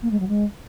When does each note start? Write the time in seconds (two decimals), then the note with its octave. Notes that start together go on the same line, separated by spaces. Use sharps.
0.02 A#3
0.11 G#3
0.19 F#3
0.28 G#3